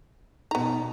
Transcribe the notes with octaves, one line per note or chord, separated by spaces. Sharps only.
B2 B3 D#4 A#5